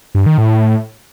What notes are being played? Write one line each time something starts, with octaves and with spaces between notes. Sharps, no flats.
G2
D#3
A2